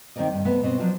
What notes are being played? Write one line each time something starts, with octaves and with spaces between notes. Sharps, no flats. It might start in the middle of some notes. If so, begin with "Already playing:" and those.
D#3 A#3 C4 A#4 D5 D#5
G2
C3 A3 B3 D#5
B2 C4 D#5
F3 F#3 D4 F4